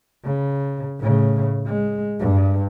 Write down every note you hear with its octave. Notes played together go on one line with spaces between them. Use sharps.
C#3
A2 C#3
G#3
G2